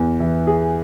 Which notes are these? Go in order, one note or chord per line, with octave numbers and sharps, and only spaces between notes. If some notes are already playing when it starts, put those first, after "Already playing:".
Already playing: E2 B3
E3
G#4